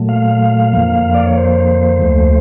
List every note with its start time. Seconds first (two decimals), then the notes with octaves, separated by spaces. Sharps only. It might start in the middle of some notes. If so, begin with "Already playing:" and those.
Already playing: A#2 F#3 A3
0.09 F5
0.73 F2 D3 F3 A#3
1.14 D5
1.26 C#5
1.37 C5
2.02 D2 D3 F3 A3